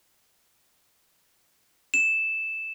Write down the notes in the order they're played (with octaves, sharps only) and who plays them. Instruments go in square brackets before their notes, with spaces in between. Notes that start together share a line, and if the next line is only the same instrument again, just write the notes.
[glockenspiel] E7